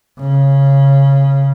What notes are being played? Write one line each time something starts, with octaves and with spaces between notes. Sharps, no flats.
C#3